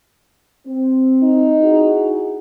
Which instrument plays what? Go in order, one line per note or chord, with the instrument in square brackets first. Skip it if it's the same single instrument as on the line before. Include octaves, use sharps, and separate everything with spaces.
[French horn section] C4
[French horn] D#4
[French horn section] E4 F#4 G#4